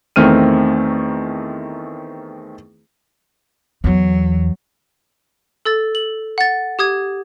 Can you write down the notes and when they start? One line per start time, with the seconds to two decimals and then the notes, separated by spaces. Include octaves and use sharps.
0.16 E2 D#3 A3 C4 F6 D#7
3.84 E2 F#3
5.65 A4 E6 A6
5.95 F#7
6.38 F#5 A6
6.79 G4 D#6 G#6